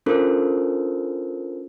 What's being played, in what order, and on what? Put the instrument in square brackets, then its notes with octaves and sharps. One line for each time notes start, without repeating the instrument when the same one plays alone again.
[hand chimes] C#4 D4 F4 A4 A#4 C5